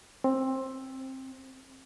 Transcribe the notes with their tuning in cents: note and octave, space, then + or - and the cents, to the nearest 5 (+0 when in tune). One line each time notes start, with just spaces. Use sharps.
C4 +15